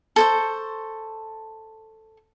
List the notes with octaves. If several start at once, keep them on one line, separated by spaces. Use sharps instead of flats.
A4 C5 C#6